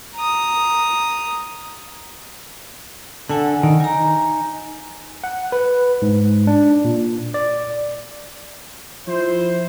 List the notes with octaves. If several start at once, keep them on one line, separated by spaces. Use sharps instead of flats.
A#5 D#6
D3 A4 F#5 G#5
D#3
D#4 G#5 A#5
F#5
B4
G#2
D4
A#2
D5
F3 E4 C5